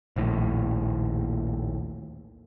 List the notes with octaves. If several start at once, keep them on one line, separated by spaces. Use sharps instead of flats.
A#1 D#2 A2